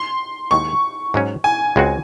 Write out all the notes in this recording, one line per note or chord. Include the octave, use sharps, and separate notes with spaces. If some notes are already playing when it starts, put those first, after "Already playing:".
Already playing: C6
D#2 D#3 G#3 C#6
G#2 F#3 C#4
G#5
C#2 C#3 G#3 C4 F#4